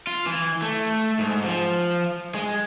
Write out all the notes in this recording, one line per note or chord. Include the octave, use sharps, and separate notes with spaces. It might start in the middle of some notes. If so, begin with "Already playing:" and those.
F4
E3
A3
G#2
F3
G#3